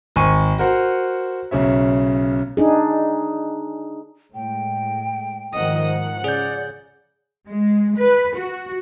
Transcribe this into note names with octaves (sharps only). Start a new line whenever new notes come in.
G#1 G#5 C#6 D#7
F#4 A#4 C5 F#5
B1 C#3 C#4 E5
D4 D#4 G#4
A2 G#3 G5
G#2 D#3 F3 D#5 F#5
F#5
C#3 G#4 D5 G6
G#3
B4
F#4